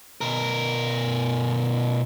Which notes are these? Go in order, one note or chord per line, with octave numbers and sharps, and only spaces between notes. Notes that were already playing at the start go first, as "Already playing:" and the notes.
B2 A#4